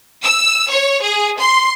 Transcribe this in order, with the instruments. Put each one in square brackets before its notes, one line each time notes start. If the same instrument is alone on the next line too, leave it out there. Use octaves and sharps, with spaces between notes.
[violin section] E6
C#5
G#4
C6